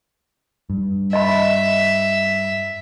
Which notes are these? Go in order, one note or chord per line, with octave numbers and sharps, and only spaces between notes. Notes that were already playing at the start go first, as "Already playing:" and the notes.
G2
D#5 E5 B5